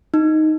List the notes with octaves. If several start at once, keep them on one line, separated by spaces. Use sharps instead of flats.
D#4